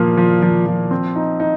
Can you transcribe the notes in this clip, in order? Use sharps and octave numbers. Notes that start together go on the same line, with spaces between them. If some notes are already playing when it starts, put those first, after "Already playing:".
Already playing: A#2 F3 A#3
F3
F3
F3
C4
D#4
D#4